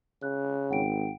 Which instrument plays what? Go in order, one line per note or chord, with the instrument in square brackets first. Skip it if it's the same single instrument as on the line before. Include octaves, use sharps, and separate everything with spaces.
[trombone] C#3 [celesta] F#6
[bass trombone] G#1 [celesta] F#5 G5 D7